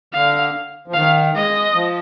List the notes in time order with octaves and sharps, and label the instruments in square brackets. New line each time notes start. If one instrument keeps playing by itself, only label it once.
[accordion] D3 [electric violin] F5
[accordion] F3
[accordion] D#3 [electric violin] F5
[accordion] G#3 [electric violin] D#5
[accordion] F3